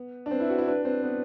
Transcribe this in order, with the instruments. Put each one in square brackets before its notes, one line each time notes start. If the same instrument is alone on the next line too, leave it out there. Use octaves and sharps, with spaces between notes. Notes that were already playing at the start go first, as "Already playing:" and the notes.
Already playing: [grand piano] B3
D4
[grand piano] C4 [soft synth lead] B4
[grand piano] E4
F#4
E4
[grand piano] D4 [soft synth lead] B4
[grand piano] C4 [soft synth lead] B4
[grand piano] B3